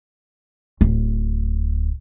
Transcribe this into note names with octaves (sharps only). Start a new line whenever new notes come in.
D1